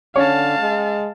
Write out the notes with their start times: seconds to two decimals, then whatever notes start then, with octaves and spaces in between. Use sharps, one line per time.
0.16 D3 C#4 C#5 F5 A5
0.58 G#3